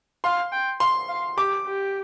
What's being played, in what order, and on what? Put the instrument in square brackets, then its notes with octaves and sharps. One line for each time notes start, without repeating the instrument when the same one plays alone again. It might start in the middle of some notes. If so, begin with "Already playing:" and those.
[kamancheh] F5 [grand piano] C6
[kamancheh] G5
[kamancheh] F5 [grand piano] C6
[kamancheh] F5
[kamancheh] G4 [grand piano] D6
[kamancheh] G4